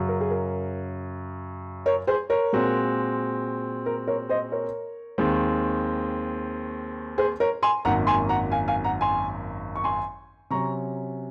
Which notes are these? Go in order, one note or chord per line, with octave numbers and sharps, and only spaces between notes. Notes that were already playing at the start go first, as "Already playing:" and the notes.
Already playing: F#2 C#3 F#3
A#4
G#4
A#4
A#4 C#5
G#4 C5
A#4 C#5
A#2 G#3 C4 F#4
A#4
A#4 C#5
C5 D#5
A#4 C#5
D#2 D#3 G#3 C4
G#4 C5
A#4 C#5
G#5 C6
G#1 F#2 D#3 A#3 F#5 A#5
G#5 C6
F#5 A#5
F5 G#5
F5 G#5
F#5 A#5
G#5 C6
C#6
G#5 C6
C3 F#3 C#4 A#5 C#6